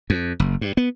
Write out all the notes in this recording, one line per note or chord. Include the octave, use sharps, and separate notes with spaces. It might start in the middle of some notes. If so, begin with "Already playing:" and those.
F2
F#1
G2
B3